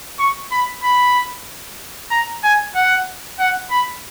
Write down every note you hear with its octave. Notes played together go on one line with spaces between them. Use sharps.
C#6
B5
B5
A#5
G#5
F#5
F#5
B5